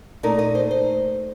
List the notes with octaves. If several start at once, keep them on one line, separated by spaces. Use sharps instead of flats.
A#2 A3 D#4 A#4
D#5
C5
C5